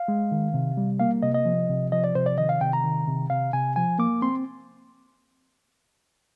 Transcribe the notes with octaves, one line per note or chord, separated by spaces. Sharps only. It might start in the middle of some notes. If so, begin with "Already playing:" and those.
Already playing: F5
G#3
D#3
C3
G3
A#3 F5
C3 D#5
D#5
F3
C3
F3 D#5
D5
C3 C5
D5
D#3 D#5
F5
C3 G5
A#5
D#3
C3
C3 F5
C3 G#5
F3 G#5
A#3 D6
C4 C6